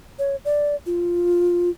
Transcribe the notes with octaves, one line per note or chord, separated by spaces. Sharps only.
C#5
D5
F4